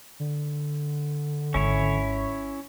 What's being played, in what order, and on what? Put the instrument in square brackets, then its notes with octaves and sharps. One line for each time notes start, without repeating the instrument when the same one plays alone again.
[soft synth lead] D3
[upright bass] G#1 [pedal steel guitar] C#4 E4 C#5